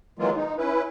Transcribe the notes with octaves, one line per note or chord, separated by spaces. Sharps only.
D#3 E3 F#3 G#3 A#3 F4
D#4
C#4 E4 B4